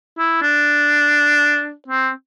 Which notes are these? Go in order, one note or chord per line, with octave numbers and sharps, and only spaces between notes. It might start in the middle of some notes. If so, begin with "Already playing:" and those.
E4
D4
C4